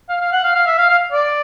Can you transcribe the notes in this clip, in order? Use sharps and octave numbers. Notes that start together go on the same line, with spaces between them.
F5
F5
F#5
F5
F5
E5
F5
F5
D5